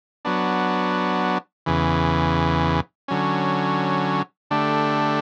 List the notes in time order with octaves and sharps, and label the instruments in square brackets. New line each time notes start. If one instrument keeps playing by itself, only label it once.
[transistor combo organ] F#3 B3 D4
E2 C#3 E3
D3 F#3 C#4
D3 A3 D4 G4